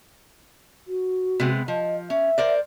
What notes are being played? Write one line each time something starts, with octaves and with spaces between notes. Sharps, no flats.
F#4
C3 G#3 B3
F3 D#5
C#4 E5
A#4 C5 D5